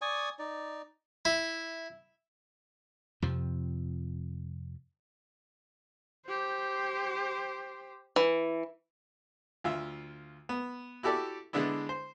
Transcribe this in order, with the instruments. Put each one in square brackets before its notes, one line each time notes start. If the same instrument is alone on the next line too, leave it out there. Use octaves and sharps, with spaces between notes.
[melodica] D5 G#5 C#6 D#6
D#4 D5
[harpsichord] E4
[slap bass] F2 C3 F3
[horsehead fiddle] G4 C5
[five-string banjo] E3
[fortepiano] D2 F4 E5
B3
E4 F#4 G4 A4 D5
D3 G#3 B3 D4 E4
C5